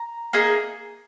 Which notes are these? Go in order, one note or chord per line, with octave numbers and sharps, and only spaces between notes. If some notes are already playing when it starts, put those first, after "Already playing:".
Already playing: A#5
A#3 D#4 G#4